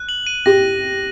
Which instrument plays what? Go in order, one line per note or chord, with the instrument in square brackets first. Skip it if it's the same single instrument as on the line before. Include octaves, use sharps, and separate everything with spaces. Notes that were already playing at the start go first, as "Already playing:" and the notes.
Already playing: [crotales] F#6
F#7
D#7
[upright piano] G4 [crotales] A#6